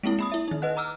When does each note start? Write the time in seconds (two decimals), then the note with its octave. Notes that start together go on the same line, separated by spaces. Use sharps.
0.03 G#3 A#3 C4 E4
0.19 A#3 B5 D#6
0.32 E4 E5
0.48 D#3 D#4
0.62 B4 D#5 F#5 F#6
0.77 A#5 D6 E6 F6